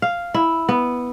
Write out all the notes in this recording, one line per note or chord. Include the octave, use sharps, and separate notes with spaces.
F5
E4
B3